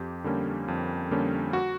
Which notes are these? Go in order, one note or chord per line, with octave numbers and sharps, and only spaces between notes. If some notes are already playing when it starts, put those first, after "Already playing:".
Already playing: F2 G4
D3 G3 A#3 C#4
F2
D3 G3 A#3 C#4
F#4